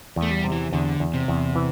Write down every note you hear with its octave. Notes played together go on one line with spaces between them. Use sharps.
E2
A3
G3
C3
E3
E2 D3
E2
C3
E2
E3